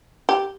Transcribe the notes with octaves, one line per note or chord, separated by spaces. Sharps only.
G4